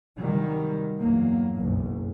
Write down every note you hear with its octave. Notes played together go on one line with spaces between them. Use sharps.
C3 D#3 F#3 G3
E2 G2 F#3 A#3
F#1 B1